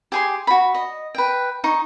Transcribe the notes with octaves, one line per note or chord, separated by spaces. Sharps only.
G4 G#4 C6
F#4 B5
D#5
B4 G5
D#4 C#6